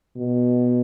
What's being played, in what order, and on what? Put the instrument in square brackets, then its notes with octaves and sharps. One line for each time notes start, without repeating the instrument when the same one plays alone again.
[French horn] B2